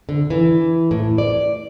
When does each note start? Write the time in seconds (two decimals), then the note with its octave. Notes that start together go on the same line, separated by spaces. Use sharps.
0.09 D3
0.30 E3
0.91 A2
1.18 D5